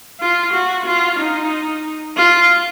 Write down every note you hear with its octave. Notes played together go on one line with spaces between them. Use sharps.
F4
F#4
F4
D#4
F4